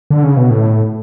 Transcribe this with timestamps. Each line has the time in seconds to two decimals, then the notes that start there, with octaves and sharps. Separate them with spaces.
0.10 D3
0.24 C#3
0.37 B2
0.50 A2